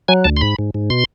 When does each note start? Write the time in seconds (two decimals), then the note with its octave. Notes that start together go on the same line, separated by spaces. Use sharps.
0.08 F#3 G#5
0.24 D2 A5
0.37 C6
0.41 G#2 B5
0.59 G#2
0.74 G#2
0.90 B2 C6